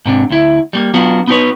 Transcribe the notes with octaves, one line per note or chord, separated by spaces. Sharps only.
G#2 C3 D4
D2 E4
G3 A3 A#3
F#3 B3 D4 F4 F#4
B3 D#4 F#4 G#4 B4 C#5